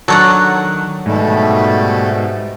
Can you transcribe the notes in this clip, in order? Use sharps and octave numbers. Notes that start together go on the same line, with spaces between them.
D#3 F#3 D4 A4 C#5 F#5
G#2 B2 G3 A3